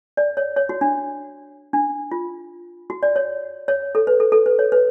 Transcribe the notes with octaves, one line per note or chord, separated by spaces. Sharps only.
D5
C#5
C#5
F#4
D4
D4
F4
F#4
D5
C#5
C#5
A4
B4
A4
A4
B4
C#5
B4